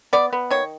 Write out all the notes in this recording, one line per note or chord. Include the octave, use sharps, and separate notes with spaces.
B3 D5
B3
D#3 C#5